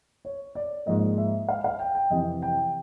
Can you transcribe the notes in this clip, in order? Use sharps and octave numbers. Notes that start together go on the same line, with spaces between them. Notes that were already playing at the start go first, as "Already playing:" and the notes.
C#5
D5
G#2 F3 A#3 D#5
E5
F5
F5
G5
G5
F2 C3 E3 D#5
G5